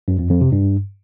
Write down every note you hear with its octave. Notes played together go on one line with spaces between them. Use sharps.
F#2
F2
F2
C3
G2